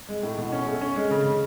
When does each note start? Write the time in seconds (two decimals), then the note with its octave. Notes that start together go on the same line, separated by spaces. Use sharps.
0.09 G#3
0.23 A2
0.38 B2
0.52 C#4
0.67 A3
0.81 C#4
0.96 G#3
1.11 C#3
1.25 C#3